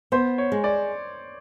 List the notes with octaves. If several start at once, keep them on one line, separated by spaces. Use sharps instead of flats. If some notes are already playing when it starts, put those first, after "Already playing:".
B3 C5
C#5
G#3
D5